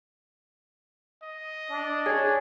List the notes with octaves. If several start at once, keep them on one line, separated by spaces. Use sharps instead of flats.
D#5
D4
G#4 C#5 G#6